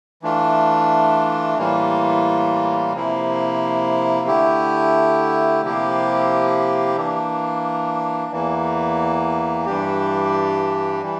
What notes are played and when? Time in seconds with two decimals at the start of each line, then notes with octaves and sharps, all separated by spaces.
0.23 E3 A3 D4 F4
1.58 A2 E3 G3 A#3 F4
2.93 C3 F3 A#3 E4
4.27 D3 A3 E4 G4
5.62 C3 F3 A#3 E4 G4
6.97 E3 A#3 D4
8.32 E2 E3 A#3
9.66 G2 E3 G3 D4 G4
11.03 E3 G3